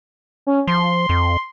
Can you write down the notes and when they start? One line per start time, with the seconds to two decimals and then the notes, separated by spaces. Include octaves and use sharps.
0.47 C#4
0.67 F3 C6
1.09 F2